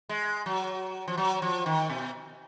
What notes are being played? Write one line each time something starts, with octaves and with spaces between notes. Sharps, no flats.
G#3
F#3
F3
F#3
F3
D#3
B2